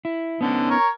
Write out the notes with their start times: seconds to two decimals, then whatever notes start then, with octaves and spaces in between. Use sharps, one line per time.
0.05 E4
0.41 D3 B3 C#4 D#4
0.70 A#4 C#5